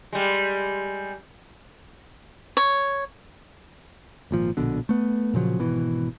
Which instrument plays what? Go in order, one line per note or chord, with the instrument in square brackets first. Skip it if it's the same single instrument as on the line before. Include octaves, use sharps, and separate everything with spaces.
[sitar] G3 G#3
[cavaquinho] C#5
[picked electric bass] G#1 A#2 F3
A#1 B2 D3
A3 B3
A#2 C#3 F3 F#3
G#1 B2 E3